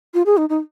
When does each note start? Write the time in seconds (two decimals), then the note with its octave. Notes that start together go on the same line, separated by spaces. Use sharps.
0.14 F4
0.26 G#4
0.37 D#4
0.49 D#4